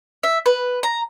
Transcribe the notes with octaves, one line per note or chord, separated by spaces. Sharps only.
E5
B4
A#5